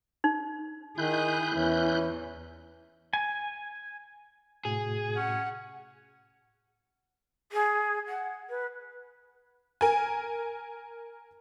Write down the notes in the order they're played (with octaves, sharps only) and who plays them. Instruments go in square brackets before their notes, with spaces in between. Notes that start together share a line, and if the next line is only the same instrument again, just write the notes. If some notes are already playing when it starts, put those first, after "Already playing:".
[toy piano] D#4
[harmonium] D#3 [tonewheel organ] E4 F#6 G6 [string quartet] G#4
[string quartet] E2 [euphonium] E3 [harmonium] C#4
[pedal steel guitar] G#5
[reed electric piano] A2 C3 F#4 [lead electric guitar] G#4
[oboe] C#4 [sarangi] F#5
[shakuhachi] G#4
F#5
B4
[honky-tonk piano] A#4 G#5